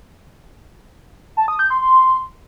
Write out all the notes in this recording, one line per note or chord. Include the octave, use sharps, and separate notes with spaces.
A5
D#6
G6
C6
C6